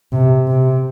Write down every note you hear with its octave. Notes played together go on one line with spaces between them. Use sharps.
C3
C3